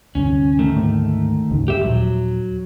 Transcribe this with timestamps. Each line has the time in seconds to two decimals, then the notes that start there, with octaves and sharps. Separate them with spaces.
0.15 D2 G2 C3 C#4
0.59 D#3 A3
0.76 D2 G#2 A#3
1.51 D2 G#2 C#3
1.68 G2 G4 E5
1.84 D#2 A#2 F3 F#3